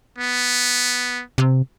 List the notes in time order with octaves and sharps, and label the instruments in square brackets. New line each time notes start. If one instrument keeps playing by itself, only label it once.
[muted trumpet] B3
[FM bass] C3